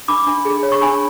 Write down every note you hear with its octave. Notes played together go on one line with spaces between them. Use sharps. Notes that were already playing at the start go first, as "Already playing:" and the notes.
D4 B5 D6
D4
G#4
C#5
C#6
D4 G#5 B5